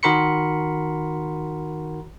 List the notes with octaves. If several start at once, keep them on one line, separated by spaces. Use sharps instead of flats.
D#3 F#4 A#4 B5 C6 C#7